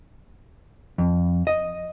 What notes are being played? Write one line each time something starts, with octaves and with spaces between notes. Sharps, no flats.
F2
D#5